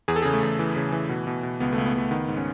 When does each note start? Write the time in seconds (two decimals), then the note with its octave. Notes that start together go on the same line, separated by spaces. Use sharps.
0.08 E2 G#4
0.16 A4
0.22 C#3 G#4
0.33 A3
0.43 E2
0.59 E3
0.76 C#3
0.92 E3
1.09 B2
1.27 B2
1.43 B2
1.60 C#2 B3
1.73 A3
1.78 C#2
1.86 B3
1.94 C#2 A3
2.11 D#3 B3
2.28 G#2
2.37 C#4